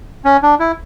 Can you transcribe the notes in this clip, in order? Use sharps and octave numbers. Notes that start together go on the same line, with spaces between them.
C#4
D4
E4